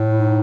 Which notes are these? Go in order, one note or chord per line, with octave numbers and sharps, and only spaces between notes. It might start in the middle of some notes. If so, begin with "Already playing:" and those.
Already playing: A2
E4
D#4